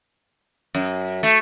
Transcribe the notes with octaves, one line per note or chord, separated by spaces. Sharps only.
F#2
A3